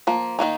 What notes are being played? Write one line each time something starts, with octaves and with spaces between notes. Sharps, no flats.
F3 A#3
D#3 G3 A#3 D#4